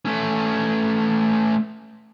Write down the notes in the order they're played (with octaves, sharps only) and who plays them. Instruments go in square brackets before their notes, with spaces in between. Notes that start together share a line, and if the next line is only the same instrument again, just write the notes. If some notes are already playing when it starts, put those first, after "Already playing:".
[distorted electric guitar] A3 C#4